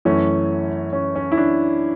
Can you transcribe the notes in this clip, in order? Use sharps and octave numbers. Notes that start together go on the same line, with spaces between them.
F#2 E3 A3 C#4
C#4
C#4
E4
D4